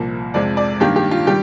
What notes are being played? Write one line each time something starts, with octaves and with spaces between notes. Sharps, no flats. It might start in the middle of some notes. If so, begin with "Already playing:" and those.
Already playing: C2 A#2 F3 A#3
F2 C3 F3 G#3 D5
D5
G2 D#3 A#3 G4
G4
F4
D#3 G3 G4